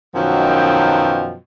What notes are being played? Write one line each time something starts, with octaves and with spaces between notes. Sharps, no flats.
F#2 B2 D#3 F3 F#3 G5